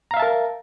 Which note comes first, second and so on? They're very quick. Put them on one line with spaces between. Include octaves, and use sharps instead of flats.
A#5 F5 E5 A5 A#4